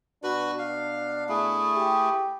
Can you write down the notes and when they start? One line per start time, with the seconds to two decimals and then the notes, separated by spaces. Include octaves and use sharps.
0.24 B2 D4 F#4 B4
0.59 F5
1.29 A3 E4 G#4
1.76 G4